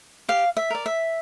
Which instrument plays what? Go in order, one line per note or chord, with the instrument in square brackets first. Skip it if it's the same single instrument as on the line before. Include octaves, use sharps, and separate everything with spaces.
[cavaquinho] G4 F5
E5
A#4 D5
E5